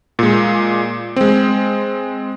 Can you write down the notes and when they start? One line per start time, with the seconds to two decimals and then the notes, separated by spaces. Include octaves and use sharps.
0.19 A#2 G#3
1.16 G#3 C4